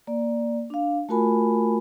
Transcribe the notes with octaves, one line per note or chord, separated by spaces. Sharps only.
A#3 D5
D4 F5
A3 F4 F#4 A#4 G#5 B5